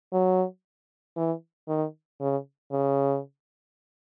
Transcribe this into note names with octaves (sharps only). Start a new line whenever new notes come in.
F#3
E3
D#3
C#3
C#3